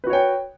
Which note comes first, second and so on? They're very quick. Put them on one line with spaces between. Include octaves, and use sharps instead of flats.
B4 F#4 C#5 G5